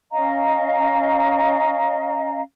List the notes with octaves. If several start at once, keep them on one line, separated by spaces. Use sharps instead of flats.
C#4 D#5 F5 A#5